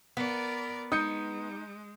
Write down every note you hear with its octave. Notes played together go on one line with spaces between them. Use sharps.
B3 A#4 D5
G#3 D#4 D#6 G6 C#7